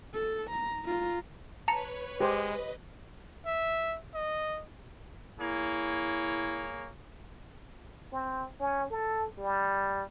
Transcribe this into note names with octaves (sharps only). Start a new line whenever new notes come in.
A4
A#5
F4 A#5
B4 C#5 A5 A#5 C#7
G#3 G4 B4 C5 D#5
E5
D#5
A#3 E4 G#4 C#5
C4
C#4
A4
G3